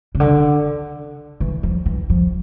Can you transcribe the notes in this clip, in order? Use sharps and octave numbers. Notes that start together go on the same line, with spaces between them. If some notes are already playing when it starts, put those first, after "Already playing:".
C#3
D3
E3
F3
E3
F3